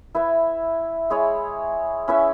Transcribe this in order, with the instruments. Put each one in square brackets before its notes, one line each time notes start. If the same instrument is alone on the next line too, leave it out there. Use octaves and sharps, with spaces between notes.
[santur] E4 B4 E5
G#3 E4 G#4 C#5
C#4 E4 B4 E5